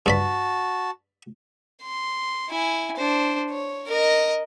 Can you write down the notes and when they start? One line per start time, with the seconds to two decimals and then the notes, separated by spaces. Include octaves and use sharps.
0.06 G2 F#4 D5 A5 B5
1.83 C6
2.49 E4 G#5
2.96 D4 C5
3.50 C#5
3.87 A#4 D#5